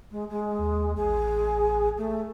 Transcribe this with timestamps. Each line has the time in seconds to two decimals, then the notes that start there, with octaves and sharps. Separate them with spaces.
0.11 G#3
0.29 G#3
0.59 D#2
0.97 A1 G#4
1.97 A3